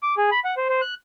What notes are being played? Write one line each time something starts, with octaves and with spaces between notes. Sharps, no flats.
D6
G#4
B5
F#5
C5
C5
F#6